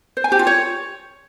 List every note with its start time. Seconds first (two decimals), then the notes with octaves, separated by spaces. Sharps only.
0.17 C5
0.24 G#5
0.32 G4
0.39 F4
0.47 C#5